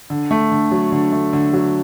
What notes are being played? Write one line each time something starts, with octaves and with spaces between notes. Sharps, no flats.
D3
A3
D3
F#3
D3
A3
D3
F#3